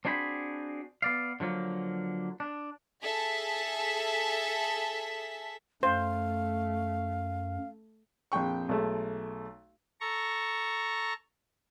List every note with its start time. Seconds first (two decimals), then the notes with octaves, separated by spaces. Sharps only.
0.05 C4 D4 F#4 G#4 C5 B5
1.02 B3 D5 F5
1.40 D3 F3 F#3 A#3
2.40 D4
3.03 G#4 A4 E5 B6
5.83 F#2 A3 C5 F5
8.32 A#1 F2 G5 C#6
8.69 B1 G#3 A3
10.01 A4 A#5 C#6